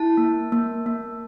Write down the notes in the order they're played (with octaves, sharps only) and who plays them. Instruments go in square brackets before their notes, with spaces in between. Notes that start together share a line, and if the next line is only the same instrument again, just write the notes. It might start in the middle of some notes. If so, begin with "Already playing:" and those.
Already playing: [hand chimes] E4 A5
A#3
A#3
A#3